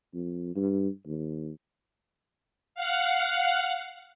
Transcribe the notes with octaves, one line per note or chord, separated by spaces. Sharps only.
F2
G2
D#2
F5 F#5